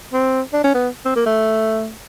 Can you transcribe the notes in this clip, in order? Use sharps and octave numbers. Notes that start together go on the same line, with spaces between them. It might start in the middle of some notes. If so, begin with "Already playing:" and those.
C4
D4
C#4
B3
C4
A#3
A3